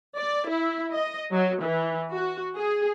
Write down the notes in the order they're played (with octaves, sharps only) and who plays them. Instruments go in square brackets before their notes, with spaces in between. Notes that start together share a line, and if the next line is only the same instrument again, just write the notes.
[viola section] D5
E4
D#5
F#3
E3
F#4
G#4